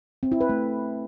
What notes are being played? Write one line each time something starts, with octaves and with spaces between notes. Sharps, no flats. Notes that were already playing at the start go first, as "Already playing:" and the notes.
C4
E4
B4
A3